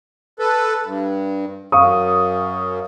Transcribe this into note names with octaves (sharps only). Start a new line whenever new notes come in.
A4 B4
G2
F#2 F5 C#6 D#6